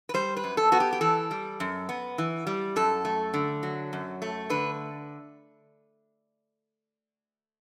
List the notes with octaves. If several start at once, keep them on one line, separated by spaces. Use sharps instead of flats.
B4
G3 C5
B4
F#2
A4
B3 F#4
G4
G4
E3 A4
G3
F#2
B3
E3
G3
F#2 A4
A3
D3
F#3
F#2
A3
D3 B4